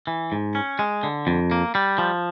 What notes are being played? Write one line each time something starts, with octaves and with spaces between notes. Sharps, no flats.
E3
G#2
C#4
G#3
D3
F2
A#3
G3
F3